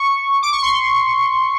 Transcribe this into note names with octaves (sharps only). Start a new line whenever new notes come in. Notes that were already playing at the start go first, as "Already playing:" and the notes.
Already playing: C#6
D6
C#6
C6